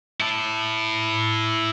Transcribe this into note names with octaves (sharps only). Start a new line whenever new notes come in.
E4 A5